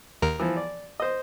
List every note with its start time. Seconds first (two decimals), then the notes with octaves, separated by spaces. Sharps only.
0.22 D#2 A#4
0.39 E3 F3
0.57 D5
1.00 C5 D#5